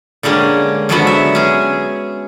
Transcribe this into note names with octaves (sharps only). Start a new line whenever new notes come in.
D3 G3 G#3 A#3 C#4
D3 F3 F#3 G#3 B3 F#4
E5
C#4 G#4